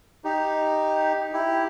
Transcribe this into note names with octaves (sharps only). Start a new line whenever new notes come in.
D#4 G4
E4 G4